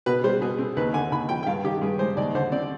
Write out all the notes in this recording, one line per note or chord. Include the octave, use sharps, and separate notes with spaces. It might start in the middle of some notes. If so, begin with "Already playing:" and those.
B2 B4
G3 C5
B2 G#4
C4
D#2 B4
D3 G#5
D#2 B5
F3 G5
G5
G2 F5
D#3 G4
G2 G#4
G#3 C5
D#2 D5
D3 C5
C4 D5